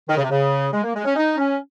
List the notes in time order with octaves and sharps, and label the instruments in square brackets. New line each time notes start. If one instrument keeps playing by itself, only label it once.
[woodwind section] D#3
C#3
C3
C#3
G#3
A#3
G#3
C#4
D#4
C#4